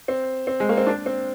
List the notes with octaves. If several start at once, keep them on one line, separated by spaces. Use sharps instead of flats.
C4
C4
G#3
A#3
C4
D4
C4